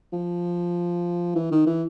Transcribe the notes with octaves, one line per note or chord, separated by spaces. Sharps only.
F3
E3
D#3
E3